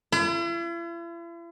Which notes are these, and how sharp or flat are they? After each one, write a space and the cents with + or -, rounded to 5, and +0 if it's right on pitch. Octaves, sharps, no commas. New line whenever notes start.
E4 +45